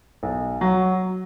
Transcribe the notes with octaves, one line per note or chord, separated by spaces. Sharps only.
B1
F#3